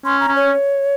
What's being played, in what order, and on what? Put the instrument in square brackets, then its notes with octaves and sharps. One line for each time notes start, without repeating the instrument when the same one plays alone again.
[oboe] C#4 [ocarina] C6
[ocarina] A#5
[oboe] C#4
[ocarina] C#5